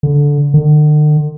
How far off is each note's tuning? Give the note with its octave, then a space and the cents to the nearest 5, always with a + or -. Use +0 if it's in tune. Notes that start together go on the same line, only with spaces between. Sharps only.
D3 -15
D3 +45